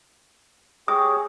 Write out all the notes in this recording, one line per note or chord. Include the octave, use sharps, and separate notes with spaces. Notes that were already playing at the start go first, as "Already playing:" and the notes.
G4 G#4 C#5 D#6